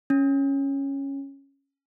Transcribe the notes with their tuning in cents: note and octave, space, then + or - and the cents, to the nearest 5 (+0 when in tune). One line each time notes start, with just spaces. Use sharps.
C#4 -5